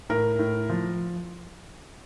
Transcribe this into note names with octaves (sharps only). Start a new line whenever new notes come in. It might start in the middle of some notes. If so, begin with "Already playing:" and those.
A2 A#4
A2
F3